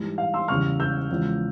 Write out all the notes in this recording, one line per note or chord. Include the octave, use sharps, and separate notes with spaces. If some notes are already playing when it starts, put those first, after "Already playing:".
Already playing: G#2 E3 G3
F5
C6 E6
E2 C#3 G3 C#6 F6
E6 G6
E2 C#3 F3 G#3